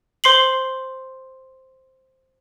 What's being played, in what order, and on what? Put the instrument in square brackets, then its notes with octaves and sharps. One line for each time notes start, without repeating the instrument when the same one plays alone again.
[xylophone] C5 C6 C7 F#7